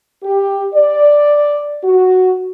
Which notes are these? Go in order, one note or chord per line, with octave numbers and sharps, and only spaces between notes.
G4
D5
F#4